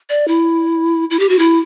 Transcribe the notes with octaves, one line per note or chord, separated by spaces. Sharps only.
D5
E4
E4
G4
F#4
E4